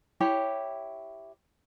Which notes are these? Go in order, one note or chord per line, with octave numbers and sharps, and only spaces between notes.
E4 G4 C#5